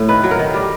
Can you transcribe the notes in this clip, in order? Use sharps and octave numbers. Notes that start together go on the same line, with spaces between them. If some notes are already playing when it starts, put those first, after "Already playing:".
Already playing: A2
D#3 B4
F#3
A#4
D#3
G3